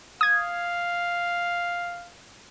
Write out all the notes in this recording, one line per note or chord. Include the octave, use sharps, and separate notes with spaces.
F5 D#6 G#6